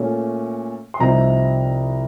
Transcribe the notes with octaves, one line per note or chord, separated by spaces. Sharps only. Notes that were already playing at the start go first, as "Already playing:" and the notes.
Already playing: A#2 A3 C#4
C6
C2 C3 F3 C4 D#4 A#5